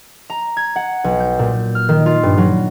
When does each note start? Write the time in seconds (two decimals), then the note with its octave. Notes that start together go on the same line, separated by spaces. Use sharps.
0.30 A#5
0.57 G#6
0.76 F#5
1.04 B1
1.20 G6
1.39 A#2
1.75 F6
1.89 D#3
2.06 F4
2.23 G2
2.37 F#3